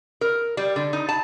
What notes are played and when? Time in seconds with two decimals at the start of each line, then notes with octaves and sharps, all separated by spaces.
0.21 A#4
0.57 G3
0.76 D3
0.93 D#4
1.09 A5